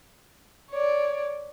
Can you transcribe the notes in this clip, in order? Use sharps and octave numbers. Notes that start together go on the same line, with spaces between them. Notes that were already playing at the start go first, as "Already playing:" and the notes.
C#5 D5